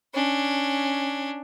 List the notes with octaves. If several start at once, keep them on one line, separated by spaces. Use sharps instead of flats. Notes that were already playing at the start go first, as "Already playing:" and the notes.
C#4 D4